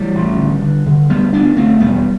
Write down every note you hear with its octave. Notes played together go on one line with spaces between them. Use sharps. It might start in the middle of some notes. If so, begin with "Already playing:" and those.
Already playing: E3 G3
A1
D3
D3
D3
D2 G3 B3
D2 B3 D4
D2 A3 C4
E1 G3 B3